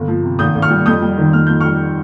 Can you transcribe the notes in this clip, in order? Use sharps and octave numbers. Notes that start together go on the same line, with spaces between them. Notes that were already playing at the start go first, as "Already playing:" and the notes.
Already playing: G1
F3
C3
G#1 D#6 G6
G#1
C#6 F6
G3
F2 D#6 G6
G3
D#3
F2 F6
F2 G6
G3 C#6 F6